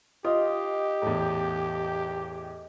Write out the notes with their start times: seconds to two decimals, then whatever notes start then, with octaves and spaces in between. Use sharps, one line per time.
0.24 F4 G4 D#5
1.02 E2 A2